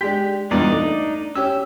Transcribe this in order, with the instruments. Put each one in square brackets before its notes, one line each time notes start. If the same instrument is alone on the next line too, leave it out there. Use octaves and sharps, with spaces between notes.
[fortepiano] G#3 D4 [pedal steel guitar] G4
[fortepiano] E2 G2 A#2 [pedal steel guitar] D4 D#4 D5
[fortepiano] A3
[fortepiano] C#4 G4 [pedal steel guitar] E6